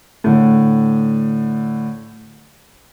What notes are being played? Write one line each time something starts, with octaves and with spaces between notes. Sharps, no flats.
A2 D3